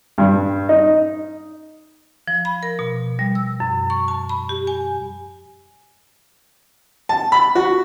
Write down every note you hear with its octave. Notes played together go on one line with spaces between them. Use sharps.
G2
D#4
F3
B5
A#4
B2
G3
E6
F#2
C#6
A5
B5
G4
G#5
A5
B5
F#4